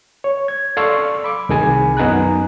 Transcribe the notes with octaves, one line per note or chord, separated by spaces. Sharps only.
C#5
G#6
A4 D5 F5 C6 C#6 E6
B5 D6
C2 D#3 G#4 G#5 B5
F#2 B3 D#4 G#5 A#5 F#6